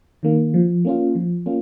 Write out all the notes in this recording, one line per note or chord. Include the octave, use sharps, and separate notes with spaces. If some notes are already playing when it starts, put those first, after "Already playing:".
D#3 A#3
F3
A#3 C#4 F4
F3
A#3 C#4 F4